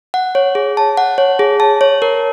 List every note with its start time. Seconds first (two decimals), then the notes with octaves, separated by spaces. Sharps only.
0.14 F#5
0.35 C#5
0.55 G#4
0.77 A5
0.97 F#5
1.18 C#5
1.39 G#4
1.60 A5
1.81 C#5
2.02 A#4